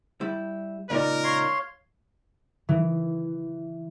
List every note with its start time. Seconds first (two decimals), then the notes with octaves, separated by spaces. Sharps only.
0.21 G3 E4
0.90 C#2 A#2 D#4 A#4 D5
1.24 C#5 F5 C6
2.69 E3